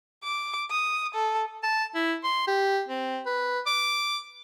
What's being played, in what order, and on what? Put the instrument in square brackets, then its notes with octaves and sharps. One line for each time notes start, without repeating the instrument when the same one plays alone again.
[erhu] D6
D#6
A4
[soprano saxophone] A5
E4
C6
G4
C4
B4
D6